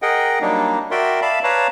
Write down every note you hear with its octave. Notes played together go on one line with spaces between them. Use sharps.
G#4 A#4 D#5 F#5 G5
F#3 G3 A#3 D4 D#4
F#4 A#4 D5 E5 G5 C6
D5 E5 F5 A5 B5
B4 C#5 D5 F5 A5 A#5